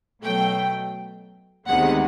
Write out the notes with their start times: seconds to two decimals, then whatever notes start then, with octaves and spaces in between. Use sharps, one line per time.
0.22 B2 F#3 A3 G5
1.67 D2 C3 D#3 G#3 B3 F#5